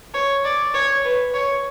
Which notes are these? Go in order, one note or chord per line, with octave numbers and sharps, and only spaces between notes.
C#5
D5
C#5
B4
C#5